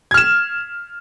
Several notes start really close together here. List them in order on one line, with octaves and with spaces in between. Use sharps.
G#6 F6 E7